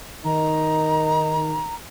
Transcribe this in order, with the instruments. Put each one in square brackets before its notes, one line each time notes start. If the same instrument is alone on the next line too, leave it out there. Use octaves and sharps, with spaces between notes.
[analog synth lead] D#3 [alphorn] D#4 [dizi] A#5